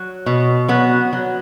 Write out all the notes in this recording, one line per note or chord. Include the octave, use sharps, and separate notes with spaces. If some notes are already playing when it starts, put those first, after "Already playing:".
Already playing: F#3
B2
F#3 B3
F#3